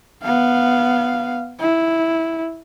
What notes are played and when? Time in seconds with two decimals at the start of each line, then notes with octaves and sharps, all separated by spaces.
0.23 B3 F5
1.60 E4